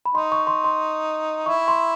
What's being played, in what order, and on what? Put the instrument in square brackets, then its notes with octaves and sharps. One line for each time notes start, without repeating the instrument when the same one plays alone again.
[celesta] B5
[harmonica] D#4 [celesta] C6
[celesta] C#6
C6
C6
[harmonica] E4 [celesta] C#6
[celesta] C6